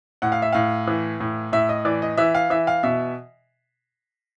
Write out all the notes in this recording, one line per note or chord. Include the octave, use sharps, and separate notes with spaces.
A2 F#5
F5
E5
A2 F5
E3
A2
A2 E5
D#5
E3 D5
D#5
E3 E5
F5
E3 E5
F5
B2 E5